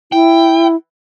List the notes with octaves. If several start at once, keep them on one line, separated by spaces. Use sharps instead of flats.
E4 G5